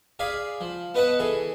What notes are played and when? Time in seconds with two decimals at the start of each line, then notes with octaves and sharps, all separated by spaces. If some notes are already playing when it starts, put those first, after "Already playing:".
0.19 G#4 D5 F5 B5
0.61 F3
0.95 B3 B4 D#5 F#5 A5
1.20 E3 G#4 A4